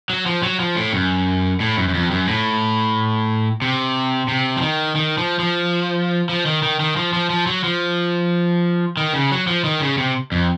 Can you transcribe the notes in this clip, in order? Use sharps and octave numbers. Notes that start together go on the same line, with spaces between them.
F#3
F3
F#3
F3
A2
F#2
A2
F#2
F#2
F2
F#2
A2
C3
C3
F3
D#3
D#3
F3
F3
F3
D#3
D#3
D#3
F3
F3
F3
F#3
F3
D#3
C#3
F#3
F3
D#3
C#3
C3
F2